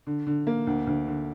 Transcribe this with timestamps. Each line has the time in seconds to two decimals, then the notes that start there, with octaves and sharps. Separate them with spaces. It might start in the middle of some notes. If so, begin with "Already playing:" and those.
0.07 D3
0.27 D3
0.47 A#3
0.67 D2
0.87 D2
1.07 D3